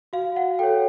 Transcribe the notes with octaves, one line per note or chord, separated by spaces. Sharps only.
F#4 F5
F#5
A4 C#5 G5